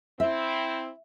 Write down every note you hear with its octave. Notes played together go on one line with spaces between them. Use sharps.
C4 E4 E5